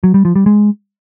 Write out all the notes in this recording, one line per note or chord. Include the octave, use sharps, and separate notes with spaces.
F#3
G3
F3
G3
G#3